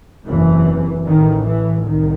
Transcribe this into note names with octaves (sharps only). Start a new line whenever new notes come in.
F#1 E2 C3 E3
A1 A2 D#3
E3
C2 D#3